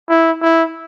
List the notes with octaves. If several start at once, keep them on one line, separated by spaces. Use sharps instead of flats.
E4
E4